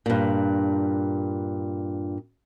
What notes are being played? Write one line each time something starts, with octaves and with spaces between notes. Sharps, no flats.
G2 A#2